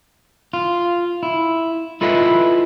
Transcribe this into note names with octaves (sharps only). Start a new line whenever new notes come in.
F4
E4
E4 F4 A4 B4 D#5 E5